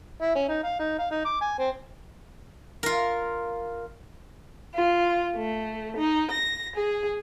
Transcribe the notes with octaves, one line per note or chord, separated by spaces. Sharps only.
E4
C#4
D#4
F5
D#4
F5
D#4
D6
G#5
C4
F4 A#4
F4
A3
D#4
A#6
G#4